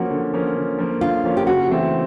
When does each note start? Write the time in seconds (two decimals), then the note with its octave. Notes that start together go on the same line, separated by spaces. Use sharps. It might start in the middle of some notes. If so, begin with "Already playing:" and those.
Already playing: F3 A#3 C#4 F#4
0.11 D3
0.34 F3 A#3 C#4
0.56 D3
0.79 F3 A#3 C#4
1.01 D3 F4
1.25 F3 A#3 C#4
1.37 G4
1.47 C#3 F#4
1.70 E3 A3 C4